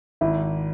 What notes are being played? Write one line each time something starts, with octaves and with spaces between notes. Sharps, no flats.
G#1 E4